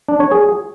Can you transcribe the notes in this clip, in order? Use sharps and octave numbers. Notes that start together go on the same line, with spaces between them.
D4
C#5
G#4